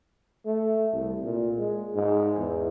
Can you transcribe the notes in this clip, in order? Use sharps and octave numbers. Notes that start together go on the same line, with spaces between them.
A3
C2
A#2
G#3
G#2
E2